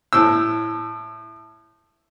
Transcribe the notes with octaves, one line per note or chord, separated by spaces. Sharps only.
A2 E6